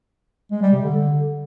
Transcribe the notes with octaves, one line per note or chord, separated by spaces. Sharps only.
G#3
G3
C3
D3